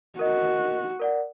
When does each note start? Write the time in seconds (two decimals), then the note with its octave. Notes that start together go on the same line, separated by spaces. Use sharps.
0.19 F#4 A#4 D#5
0.99 A#4 D5 F#5